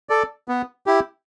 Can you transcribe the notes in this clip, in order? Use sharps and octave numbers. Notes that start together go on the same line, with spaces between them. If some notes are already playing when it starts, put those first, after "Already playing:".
A4 D5
B3
E4 G4